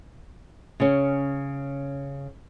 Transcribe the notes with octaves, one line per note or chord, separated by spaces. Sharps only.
C#3 C#4